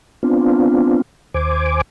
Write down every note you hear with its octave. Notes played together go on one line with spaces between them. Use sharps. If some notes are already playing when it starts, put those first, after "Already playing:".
B3 C4 D4 F4
D#2 C5 G#5 D6